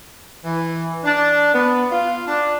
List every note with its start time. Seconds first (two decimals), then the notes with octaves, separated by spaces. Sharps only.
0.44 E3
1.04 D4
1.54 B3
1.90 F4
2.27 D4